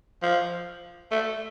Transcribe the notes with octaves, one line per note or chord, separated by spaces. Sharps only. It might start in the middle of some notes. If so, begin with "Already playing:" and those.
F3
A3